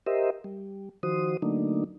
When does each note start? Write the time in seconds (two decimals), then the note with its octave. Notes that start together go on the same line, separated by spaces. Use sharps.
0.07 G4 A#4 C5 D#5 E5
0.44 G3
1.03 D#3 F3 F#4 C5 D#6
1.42 D3 F#3 A3 A#3 D4 D#4